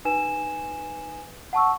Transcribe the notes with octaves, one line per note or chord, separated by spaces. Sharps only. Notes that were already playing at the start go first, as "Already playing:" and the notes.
D#4 B4 G#5 E7
F#5 A5 C#6 E6